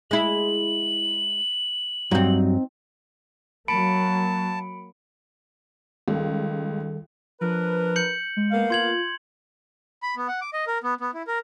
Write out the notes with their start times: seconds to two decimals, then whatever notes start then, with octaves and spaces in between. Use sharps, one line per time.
0.11 G#3 E4 F#7
2.11 G2 F#3 C4 D#4
3.68 F#3 A#3 A5 B5 C#7 D7
6.08 C#2 D#3 G3 A4
7.41 F3 D4 A#4 B4
7.96 G6 C#7 F#7
8.37 G#3
8.51 A#3 B3 F5
8.70 F4 C6 G#6 F#7
10.03 B5
10.17 B3
10.28 F#5
10.41 D6
10.53 D#5
10.67 A#4
10.83 B3
11.00 B3
11.14 E4
11.27 A#4